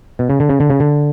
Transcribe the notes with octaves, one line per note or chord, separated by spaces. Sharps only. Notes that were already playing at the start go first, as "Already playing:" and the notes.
B2
C#3
D3
C#3
D3
C#3
D3